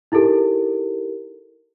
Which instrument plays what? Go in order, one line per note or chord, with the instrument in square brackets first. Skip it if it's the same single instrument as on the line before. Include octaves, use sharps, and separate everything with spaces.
[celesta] D#4 E4 G4 A4 A#4